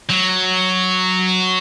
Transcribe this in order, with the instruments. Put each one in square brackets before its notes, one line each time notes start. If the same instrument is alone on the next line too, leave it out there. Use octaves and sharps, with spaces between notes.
[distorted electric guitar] F#3